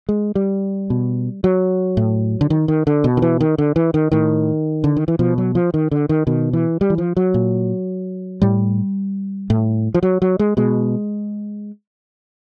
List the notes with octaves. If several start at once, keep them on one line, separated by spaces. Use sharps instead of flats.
G#3
G3
B2
F#3
A2
D3
D#3
D#3
D3
B2
D#3
E3
D#3
D3
E3
D#3
A2 D#3
D3
D#3
E3
B2 F3
F#3
F3
D#3
D3
D#3
B2 D#3
E3
G3
E3
F3
F#3
A#2
A2 G3
A2
F3
F#3
F#3
G#3
B2 G#3